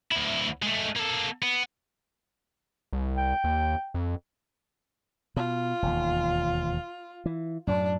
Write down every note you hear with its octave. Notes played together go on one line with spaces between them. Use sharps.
D2 E4
G#3 A3
A#3 A4
B3
C2
G5
D#2
F2
B2 F4
E1 D#2
E3
F#2 A2 F#3 D4